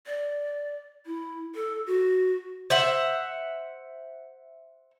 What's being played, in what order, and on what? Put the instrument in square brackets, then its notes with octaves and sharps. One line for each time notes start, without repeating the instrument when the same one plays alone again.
[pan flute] D5
E4
A4
F#4
[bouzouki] C5 E5 F#5